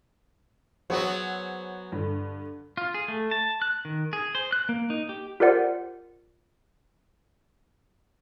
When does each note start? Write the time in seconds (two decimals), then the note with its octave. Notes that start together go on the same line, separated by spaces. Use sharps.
0.90 F#3 B3 F#4 G#4 C5 F#5
1.92 G2 D3
2.77 F4
2.94 G#4
3.08 A3
3.31 A5
3.62 F#6
3.85 D#3
4.13 G#4
4.35 C5
4.52 F#6
4.69 A#3
4.90 D#4
5.09 G4
5.40 F4 G4 A#4 C5 D5 F#5